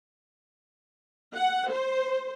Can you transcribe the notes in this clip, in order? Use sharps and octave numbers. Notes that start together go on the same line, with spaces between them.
F#5
C5